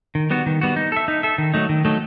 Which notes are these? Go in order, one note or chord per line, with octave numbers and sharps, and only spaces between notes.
D#3
G3 B3 F#4
D#3
G3 B3 F#4
D#4
A4 E5
D#4
A4 E5
D#3
F#3 A3 D#4
D#3
F#3 A3 D#4